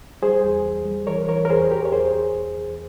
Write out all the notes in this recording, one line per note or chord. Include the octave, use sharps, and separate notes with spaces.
G3 G#4 C5
E2
E2
G3
E3 A#4 C#5
E3 A#4 C#5
A#4
E2 G#4 C5
E2 G4 A#4
C#5
E2 G#4 C5
E2
E2
E2